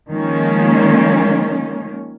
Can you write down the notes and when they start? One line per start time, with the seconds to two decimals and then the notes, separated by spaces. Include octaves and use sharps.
0.10 D#3 F3 G#3 A#3 C#4